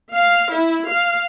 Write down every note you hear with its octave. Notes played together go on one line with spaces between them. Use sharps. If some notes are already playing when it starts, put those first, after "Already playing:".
F5
E4
F5